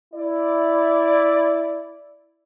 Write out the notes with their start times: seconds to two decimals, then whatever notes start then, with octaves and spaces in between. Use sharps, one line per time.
0.14 E4 D5